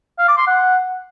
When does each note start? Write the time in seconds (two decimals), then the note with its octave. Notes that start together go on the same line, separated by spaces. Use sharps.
0.19 F5
0.28 D6
0.37 C6
0.47 F#5